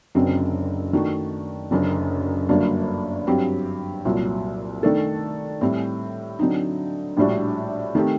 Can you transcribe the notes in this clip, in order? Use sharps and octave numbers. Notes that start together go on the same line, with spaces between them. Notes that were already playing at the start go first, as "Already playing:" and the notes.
F#1 F#2 D3 F#3 C4
D#3 A3 D4 F#4
F#1 F#2 D3
G1 G2 F#3 A#3 D4
G2 F#3 C4 G4
C2 A#2 F#3
D#3 A3 D4 A4
A2 G3 C4
D3 F#3 C4 D#4
A#1 A2 G3 D4 F#4
D#3 A3 C4 G4